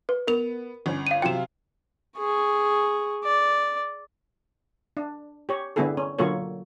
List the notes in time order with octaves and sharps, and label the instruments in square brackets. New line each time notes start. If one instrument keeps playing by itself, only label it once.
[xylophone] B4
[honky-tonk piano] B3 [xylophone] A#4 F7
[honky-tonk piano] G1 C#4
[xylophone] F5 D#7
[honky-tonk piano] C3 F#3 F4 [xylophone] G5 E7
[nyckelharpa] G#4 C#6
D5
[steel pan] D4
G4 C#5
D3 G3 B3 E4 G#4 A4
C#4
D3 F#3 A#3 F4 A4 C#5